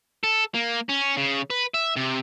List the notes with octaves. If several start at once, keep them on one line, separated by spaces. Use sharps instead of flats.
A4
A#3
C#4
C#3
B4
E5
C3